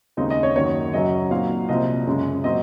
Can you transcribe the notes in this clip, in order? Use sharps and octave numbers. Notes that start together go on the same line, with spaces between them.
D#2 C#3 G#3 C4 D#4 D#5
D#5
C#5
F#2 D#3 F#3 A#3 C#5
F#2 C#3 F#3 C#4 D#5
A#2 F#3 C4 D#4 F5
C2 A#2 F3 C4 D#5
F#2 C#3 G#3
A#2 F#3 C4 D#5